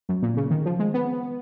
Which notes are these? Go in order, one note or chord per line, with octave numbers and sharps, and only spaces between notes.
F#2
A#2
C#3
D#3
F3
G#3
B3